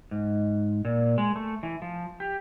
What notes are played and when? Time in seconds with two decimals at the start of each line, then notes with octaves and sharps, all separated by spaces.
0.11 G#2
0.85 A#2
1.18 G#3
1.36 A3
1.63 E3
1.82 F3
2.20 G4